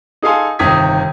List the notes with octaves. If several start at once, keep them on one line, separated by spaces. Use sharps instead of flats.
D#4 G#4 A4 F5 G#5 C6
G1 C3 D#3 D#6 G#6 B6